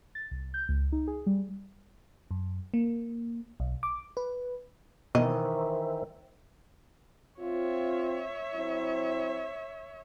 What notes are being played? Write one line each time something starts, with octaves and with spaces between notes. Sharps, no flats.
A6
C2
G6
C#2
D#4
G#4
G3
F#2
A#3
B1
D6
B4
B2 D#3 E3 A#4 C5 D#5 E5
C4 F4 C#5 E5
F#3 C4 E4